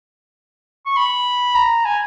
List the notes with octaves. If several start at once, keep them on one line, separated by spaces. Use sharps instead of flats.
C#6
B5
A#5
G#5